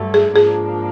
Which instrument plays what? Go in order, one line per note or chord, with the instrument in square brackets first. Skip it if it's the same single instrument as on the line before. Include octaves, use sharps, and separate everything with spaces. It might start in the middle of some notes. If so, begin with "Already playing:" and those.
Already playing: [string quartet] G2 D3 F#3 A3
[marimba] G#4
[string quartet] G#2 F3 A#3 D4 [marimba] G#4